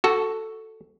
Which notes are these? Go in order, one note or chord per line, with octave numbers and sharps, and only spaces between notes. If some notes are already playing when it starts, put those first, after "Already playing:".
F#4 A4